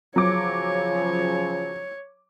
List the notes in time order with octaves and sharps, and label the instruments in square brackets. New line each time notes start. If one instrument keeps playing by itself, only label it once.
[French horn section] C#3 F3 [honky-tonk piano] F#3 D6 [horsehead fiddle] C#5